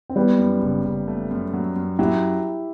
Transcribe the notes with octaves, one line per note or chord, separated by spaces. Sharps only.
C4
E3 G3 B3
F#2
F#1
F#1
A3
F#2
F#3
F#2
F#3 E4 G4